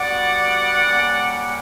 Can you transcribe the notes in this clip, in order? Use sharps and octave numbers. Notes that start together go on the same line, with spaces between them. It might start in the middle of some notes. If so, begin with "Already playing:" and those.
Already playing: G3 B3 F#4 D5 F#5
G3 A#3 C#4